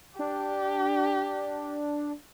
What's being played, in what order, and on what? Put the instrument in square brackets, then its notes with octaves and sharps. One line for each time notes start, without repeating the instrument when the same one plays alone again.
[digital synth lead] D4 [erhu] G4